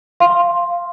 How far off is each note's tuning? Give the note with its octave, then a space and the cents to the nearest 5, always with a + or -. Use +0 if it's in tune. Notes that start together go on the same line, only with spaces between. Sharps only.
F5 -10 C6 +10